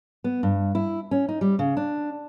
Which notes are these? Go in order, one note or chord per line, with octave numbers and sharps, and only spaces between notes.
B3
G2
E4
C#4
D#4
G3
C#3
D4